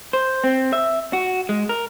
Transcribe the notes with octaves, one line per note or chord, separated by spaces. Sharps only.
C5
C4
E5
F#4
G#3
A#4